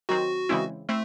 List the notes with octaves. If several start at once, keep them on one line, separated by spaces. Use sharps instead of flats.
D#3 F#3 C4 F#4
C#3 E3 G#3 C4 E4
A3 C4 E4